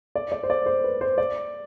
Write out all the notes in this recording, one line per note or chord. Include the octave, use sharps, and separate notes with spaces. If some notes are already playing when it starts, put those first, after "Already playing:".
D5
D5
C5
D5
C5
B4
C5
D5